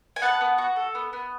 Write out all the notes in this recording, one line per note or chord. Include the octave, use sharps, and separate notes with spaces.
G#5
B3 F#5 A5
B3
F#4
A4
B3
B3